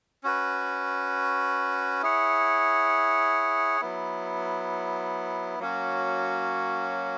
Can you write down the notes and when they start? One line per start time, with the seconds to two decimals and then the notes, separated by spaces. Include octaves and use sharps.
0.24 C#4 F#4 B4
2.02 E4 G#4 C#5 F#5
3.81 F#3 B3 E4
5.59 F#3 A#3 C#4 F#4